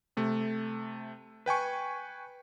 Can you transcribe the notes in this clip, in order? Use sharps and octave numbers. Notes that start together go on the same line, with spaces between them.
C3 A3
B4 G5 G#5 C#6